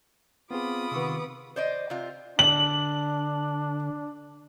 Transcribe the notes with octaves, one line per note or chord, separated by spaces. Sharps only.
B3 C4 F4 G#4 B5 D6 D#6
C3 D#3 B3 C#6 E6
C5 D5 D#5
C3 F4
D3 D4 F#7